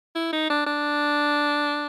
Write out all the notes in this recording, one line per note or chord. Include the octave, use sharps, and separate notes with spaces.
E4
D#4
D4
D4